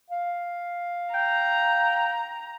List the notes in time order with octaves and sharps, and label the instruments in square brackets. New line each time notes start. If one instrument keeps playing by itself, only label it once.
[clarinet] F5
[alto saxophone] G5 [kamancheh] A#5